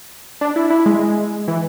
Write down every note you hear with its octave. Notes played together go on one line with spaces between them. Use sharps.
D4
E4
E4
G#3
E3